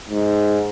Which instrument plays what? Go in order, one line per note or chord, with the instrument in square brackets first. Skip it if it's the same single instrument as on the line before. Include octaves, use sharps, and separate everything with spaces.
[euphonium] G#2